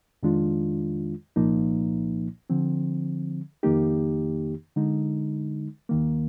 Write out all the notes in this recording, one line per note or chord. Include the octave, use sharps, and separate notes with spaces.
F2 D#3 G#3 D4 F4
C2 A#2 F3 A#3 D#4
D3 F3 C4
F2 D#3 A#3 D#4 G4
D3 G#3 D#4
D#2 D#3 A#3